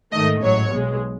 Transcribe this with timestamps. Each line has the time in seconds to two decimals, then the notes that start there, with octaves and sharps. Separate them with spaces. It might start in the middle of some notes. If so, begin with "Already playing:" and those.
0.13 G#2 D#3 A3 D#5
0.42 A1 G#2 F#3 C#5
0.72 B1 B2 G#3